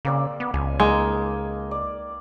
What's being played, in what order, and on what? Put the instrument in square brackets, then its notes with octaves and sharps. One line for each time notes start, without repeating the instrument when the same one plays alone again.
[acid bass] C#3 [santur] A#3 C4 D5
[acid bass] B3
[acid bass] C#2 [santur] G#5
[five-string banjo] G#3 [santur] A#3 D#4
[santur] D5